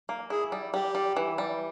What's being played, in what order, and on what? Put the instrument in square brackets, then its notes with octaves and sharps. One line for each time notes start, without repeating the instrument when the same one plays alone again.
[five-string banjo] A#3
[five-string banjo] E4 [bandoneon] G#4
[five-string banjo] G3
[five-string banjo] G3 [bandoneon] G4
[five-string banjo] G3
E3
G3